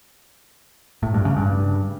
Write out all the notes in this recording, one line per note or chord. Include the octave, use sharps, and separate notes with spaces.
A2
G2
C#3
G2